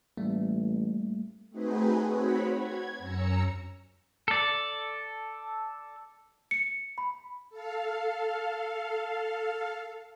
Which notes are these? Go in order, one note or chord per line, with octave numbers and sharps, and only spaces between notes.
A1 G3 A3 A#3
A3 C4 D#4 F#4 G#4 B4
C4 F#4 C#5 B5
G#6
F#2 C#4 A#5 E6 C#7
A4 D5
C#7
B5
A4 F5